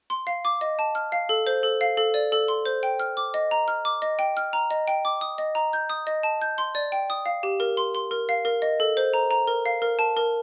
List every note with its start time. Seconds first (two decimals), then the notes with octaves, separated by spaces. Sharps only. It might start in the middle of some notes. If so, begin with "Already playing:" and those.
0.10 C6
0.27 F5
0.45 D6
0.61 D#5
0.79 A5
0.95 F6
1.12 F5
1.29 A4
1.47 C5
1.63 A4
1.81 F5
1.97 A4
2.14 D5
2.32 A4
2.48 C6
2.66 C5
2.83 G5
3.00 F6
3.17 D6
3.34 D#5
3.51 A#5
3.68 F6
3.85 D6
4.02 D#5
4.19 G5
4.37 F6
4.53 A#5
4.71 D#5
4.88 G5
5.05 D6
5.21 D#6
5.38 D#5
5.55 A#5
5.73 G6
5.90 D#6
6.07 D#5
6.23 A5
6.42 G6
6.58 C6
6.75 D5
6.92 G5
7.10 D#6
7.26 F5
7.43 G4
7.60 A#4
7.77 C6
7.95 C6
8.11 A#4
8.29 F5
8.45 A#4
8.62 D#5
8.80 A4
8.97 C5
9.14 A#5
9.31 A#5
9.47 A#4
9.66 F5
9.82 A#4
9.99 A5
10.17 A#4